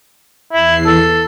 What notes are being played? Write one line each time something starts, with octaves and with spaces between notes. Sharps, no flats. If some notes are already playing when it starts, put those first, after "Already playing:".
E2 E3 E4 C7
A4